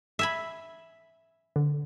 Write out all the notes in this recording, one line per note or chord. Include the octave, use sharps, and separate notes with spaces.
E5 G#5 B5
D3